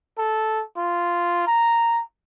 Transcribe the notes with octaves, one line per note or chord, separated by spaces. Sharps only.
A4
F4
A#5